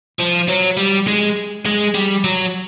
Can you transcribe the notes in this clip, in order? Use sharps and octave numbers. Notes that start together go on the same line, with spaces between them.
F3
F#3
G3
G#3
G#3
G3
F#3